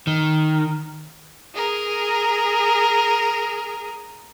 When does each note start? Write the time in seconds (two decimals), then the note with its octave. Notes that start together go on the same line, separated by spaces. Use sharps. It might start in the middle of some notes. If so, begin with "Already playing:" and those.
0.07 D#3
1.55 G#4 A#4